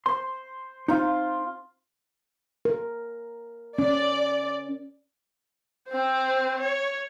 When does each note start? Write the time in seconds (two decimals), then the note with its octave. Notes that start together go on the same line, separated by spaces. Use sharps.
0.06 C5 C6
0.88 C4 D#4 F4
2.65 A#4
3.78 C#4 D5
5.90 C4 C5
6.60 C#5